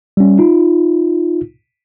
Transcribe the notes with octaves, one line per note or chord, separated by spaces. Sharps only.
G3 C#4
D#4 F4